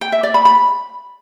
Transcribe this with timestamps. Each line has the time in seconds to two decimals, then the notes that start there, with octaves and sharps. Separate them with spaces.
0.01 G5
0.12 E5
0.23 D5
0.34 B5
0.45 B5